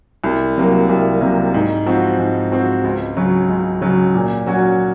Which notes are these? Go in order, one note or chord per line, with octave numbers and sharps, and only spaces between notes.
C2
C3 F#3 A#3
C2
C3 F#3 A#3
G#2
F3 C4 F#4
G#2
F3 C4 F#4
C#2
C#3 F#3
C#2
C#3 F#3
A#2
F#3 C#4 F#4